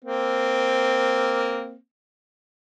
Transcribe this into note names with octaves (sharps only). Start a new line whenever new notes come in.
A#3 C4